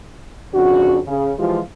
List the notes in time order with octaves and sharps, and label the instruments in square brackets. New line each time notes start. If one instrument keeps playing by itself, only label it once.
[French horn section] F2 C#3 D4 F#4
C#3
E3 F3 G#3 F4 G4